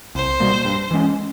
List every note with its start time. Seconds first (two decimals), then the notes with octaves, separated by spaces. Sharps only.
0.15 C2 C5
0.40 B2 G3 A#3
0.65 G2
0.91 E3 G#3 C#4